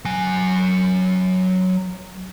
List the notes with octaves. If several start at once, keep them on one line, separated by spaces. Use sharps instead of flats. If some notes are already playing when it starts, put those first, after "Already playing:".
F#3 G#5